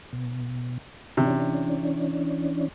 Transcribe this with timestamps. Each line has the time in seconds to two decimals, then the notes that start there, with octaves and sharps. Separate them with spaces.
0.13 B2
1.17 C3 E3 C#4 D4